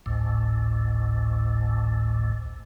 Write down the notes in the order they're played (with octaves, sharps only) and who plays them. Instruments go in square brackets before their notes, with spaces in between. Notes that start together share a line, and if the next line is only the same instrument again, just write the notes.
[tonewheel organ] G#1 D2 A2